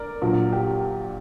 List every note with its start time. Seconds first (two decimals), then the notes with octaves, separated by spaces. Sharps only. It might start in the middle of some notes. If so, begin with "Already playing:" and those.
Already playing: A#4 D5
0.21 A#1 A#2 F#3
0.53 G4